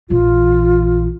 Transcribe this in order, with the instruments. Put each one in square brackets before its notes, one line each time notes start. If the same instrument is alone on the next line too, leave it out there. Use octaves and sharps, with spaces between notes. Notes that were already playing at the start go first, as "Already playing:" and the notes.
[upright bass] A#1 E3 [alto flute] F4